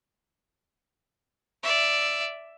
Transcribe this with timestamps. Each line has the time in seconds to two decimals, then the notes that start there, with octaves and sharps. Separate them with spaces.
1.63 D5 E5